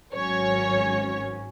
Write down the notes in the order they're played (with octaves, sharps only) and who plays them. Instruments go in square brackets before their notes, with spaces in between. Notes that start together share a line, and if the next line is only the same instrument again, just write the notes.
[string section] G#1 G#2 F#3 C#4 C#5